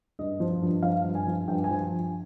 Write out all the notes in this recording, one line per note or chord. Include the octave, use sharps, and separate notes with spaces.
G2 D#5
F3
G2
F3 F5
G2
G#5
F3
G2 G5
G#5
F3